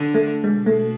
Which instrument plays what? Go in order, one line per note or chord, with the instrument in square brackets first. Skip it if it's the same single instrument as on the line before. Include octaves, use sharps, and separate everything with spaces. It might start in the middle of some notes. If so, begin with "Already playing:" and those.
Already playing: [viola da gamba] D3
[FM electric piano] A3
[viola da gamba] B2 [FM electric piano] G#3
[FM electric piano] A3